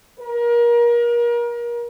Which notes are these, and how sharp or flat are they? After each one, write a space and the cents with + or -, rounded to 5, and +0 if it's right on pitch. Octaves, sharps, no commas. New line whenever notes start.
A#4 +30